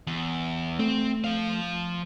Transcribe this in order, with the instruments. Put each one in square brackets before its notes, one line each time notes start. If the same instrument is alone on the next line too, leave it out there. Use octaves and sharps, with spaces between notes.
[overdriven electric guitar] E2
[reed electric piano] A3 [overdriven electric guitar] C4
[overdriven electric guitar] F3 F5